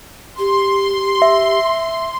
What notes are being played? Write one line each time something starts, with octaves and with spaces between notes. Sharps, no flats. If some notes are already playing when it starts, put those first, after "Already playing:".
G4 C6
E5